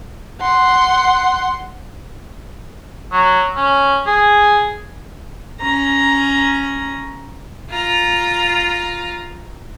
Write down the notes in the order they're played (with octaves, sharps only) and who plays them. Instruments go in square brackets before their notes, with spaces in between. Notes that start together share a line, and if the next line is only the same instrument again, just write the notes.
[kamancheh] F#5 C6
[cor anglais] F#3
C#4
G#4
[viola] C#4 A#5
F4 A#5